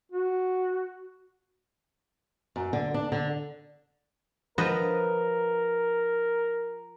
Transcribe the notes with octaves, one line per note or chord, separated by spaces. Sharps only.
F#4
F#2
D3
D4
D3
F3 A#4 B4 D#5